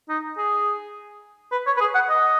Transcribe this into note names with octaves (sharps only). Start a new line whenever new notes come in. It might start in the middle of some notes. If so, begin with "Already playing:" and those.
D#4
G#4
B4
C#5
B4
G#4
F#5
D#5